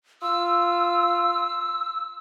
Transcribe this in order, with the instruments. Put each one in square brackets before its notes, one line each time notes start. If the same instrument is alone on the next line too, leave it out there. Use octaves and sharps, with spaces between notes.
[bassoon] F4 [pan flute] E6